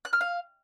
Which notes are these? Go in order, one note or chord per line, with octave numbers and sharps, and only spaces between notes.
F#6
F6
F5